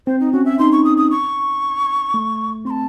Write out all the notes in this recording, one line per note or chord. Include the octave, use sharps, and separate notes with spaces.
C4 C5
D#4
C#4 F#4
E5
D#4 C6
C#6
D#6
D#6
C#6
A3
C4 C6
A5